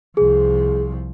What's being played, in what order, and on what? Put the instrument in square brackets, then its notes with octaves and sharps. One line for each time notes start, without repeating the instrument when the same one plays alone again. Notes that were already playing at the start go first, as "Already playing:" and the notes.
[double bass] C2 F3 [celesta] G#4